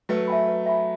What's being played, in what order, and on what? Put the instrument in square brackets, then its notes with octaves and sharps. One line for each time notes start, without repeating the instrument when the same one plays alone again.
[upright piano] F#3 A3 [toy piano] B4
[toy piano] E5 G#5 B5
B4
E5 G#5 B5